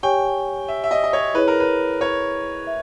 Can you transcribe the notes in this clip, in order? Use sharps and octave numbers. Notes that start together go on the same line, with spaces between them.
G4 C#5 G5 G#5 C#6
E5
E5
D#5
D#5
C#5
E4 G#4 B4 C#5
A#4
B4
C#5
E5